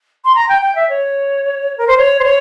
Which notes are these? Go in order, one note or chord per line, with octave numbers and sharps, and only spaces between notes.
C6
A#5
G5
G5
E5
C#5
A#4
C5
C#5
C5
C#5